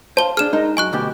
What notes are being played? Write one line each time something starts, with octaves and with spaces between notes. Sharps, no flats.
C5 F5 A5 G7
D4 G#4 F6 E7
G#3 D#4 A#4
F#2 G#5 C#6 F#6
D2 B2 G4